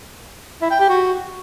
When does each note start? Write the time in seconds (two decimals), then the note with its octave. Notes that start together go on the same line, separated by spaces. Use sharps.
0.62 E4
0.71 G5
0.80 G4
0.89 F#4